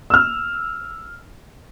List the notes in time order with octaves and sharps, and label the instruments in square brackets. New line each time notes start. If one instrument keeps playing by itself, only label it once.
[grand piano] E6 F6